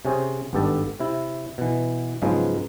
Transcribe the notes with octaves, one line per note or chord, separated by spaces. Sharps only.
C3 C#4 G#4 C5
G#1 G2 B3 G4 A4 A5
C3 E4
B2 E3
G#2 C#3 F3 F#3 G#3 B3